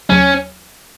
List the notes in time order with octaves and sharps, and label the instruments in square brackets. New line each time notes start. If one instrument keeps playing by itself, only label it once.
[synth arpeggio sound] D#2 C#3 F#3 [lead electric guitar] C#4